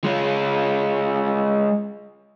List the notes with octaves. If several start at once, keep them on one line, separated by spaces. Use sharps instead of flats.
G#3 F4